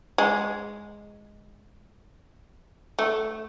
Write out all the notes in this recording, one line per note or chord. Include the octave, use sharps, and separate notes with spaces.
G#3
A3